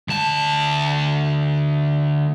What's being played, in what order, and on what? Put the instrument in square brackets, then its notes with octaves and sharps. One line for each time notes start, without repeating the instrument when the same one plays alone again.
[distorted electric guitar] D2 A5